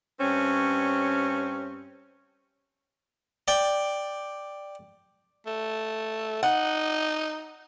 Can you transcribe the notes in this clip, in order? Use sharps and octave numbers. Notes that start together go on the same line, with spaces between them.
G2 C4 C#4 C#5
D5 G5
A3
D#4 F#5